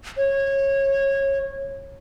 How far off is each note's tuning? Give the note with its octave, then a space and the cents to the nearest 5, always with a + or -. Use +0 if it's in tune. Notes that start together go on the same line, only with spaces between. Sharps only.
C#5 -20